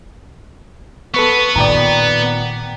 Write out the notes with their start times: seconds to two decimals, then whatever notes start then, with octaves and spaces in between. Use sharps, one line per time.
1.14 B3 A4 B4 C#6
1.56 A#2 D#3 D5 G5 A#5